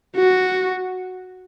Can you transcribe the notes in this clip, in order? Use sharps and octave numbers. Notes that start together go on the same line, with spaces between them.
F#4